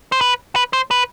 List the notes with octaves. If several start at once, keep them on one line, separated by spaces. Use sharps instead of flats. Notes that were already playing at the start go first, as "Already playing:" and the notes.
C5
B4
B4
C5
B4